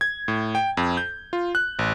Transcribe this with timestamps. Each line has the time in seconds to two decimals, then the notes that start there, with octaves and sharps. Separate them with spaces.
0.01 G#6
0.28 A2
0.55 G5
0.77 F2
0.97 G6
1.33 F4
1.55 F#6
1.79 A1